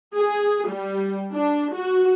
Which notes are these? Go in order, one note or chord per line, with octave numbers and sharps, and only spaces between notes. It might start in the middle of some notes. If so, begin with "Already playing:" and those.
G#4
G3
D4
F#4